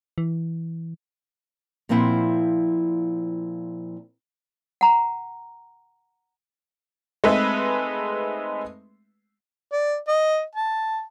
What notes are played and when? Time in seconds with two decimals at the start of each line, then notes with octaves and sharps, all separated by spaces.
0.18 E3
1.89 A#2 F3 C4 E4 F#5
4.81 F#5 A#5
7.24 G#3 A3 C4 D#4 B4 E5
9.72 D5
10.08 D#5
10.55 A5